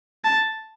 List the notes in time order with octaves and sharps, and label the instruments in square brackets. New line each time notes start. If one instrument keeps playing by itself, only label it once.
[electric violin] A5